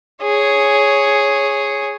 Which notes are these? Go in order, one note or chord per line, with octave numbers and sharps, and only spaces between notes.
G#4 C#5